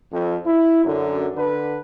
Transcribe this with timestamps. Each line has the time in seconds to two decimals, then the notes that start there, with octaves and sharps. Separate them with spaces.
0.12 F2
0.45 E4
0.84 F#2 D3
1.36 D3 B4